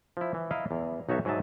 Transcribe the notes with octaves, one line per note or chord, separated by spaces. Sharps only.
F3 E4
E3
E4 D#5 F5 A#5
E2
B1 D#4 F#4 A4 C#5 E5
G#2 F#3 G#4 D#5 E5 A5